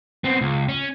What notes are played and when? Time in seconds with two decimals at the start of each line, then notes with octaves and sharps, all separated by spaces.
0.24 B3 C4
0.41 C#2
0.69 C#4